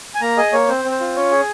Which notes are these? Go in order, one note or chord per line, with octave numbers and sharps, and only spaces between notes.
G#5
A#3 A#5
G#4 D#5
A#3 C#5
C4 C5
C4
C5
F4
C#4 C#5
G#4